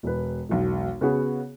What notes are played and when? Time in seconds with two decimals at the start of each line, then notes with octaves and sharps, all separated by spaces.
0.03 E1 B4
0.49 E1 B1
1.01 C#3 B3 F#4 G#4